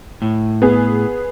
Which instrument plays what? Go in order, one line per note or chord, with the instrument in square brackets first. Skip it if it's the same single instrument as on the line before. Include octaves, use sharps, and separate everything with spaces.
[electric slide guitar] A2
[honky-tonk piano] B3 G#4